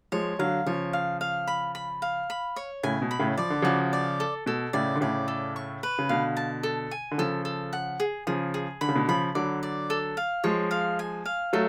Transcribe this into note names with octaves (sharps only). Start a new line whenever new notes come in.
F3 G#3 C#5
D3 F#3 F5
C#3 F3 C#5
F5
F5
B5
B5
F5
B5
C#5
A2 C#3 G#5
B2
B5
A2 C#3
F3 D5
D3
C#3 F3 F#4
D5
A4
B2 A4
A2 C#3 D5
D3
A2 C#3 D5
A4
C#6
B4
C#3
B2 D3 F5
A5
A4
G#5
D3
C#3 F3 A4
A4
F#5
G#4
C#3 F3 G#4
G#4
D3 B5
C#3
B2 D3
C#3 F3 B5
D3 F#3 D5
D5
A4
F5
F3 G#3 C#5
F5
G#5
F5
F#3 A3 A4